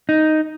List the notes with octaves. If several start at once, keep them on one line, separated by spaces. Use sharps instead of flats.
D#4